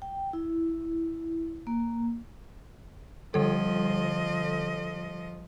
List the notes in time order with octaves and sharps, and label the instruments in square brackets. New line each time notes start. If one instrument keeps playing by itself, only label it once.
[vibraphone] G5
E4
A#3
[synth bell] D3 G3 A4 [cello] F3 D#5